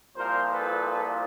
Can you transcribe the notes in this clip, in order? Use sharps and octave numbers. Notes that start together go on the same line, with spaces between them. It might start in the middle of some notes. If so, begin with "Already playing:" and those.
C2 A#2 F3 A#4 C5
A4 B4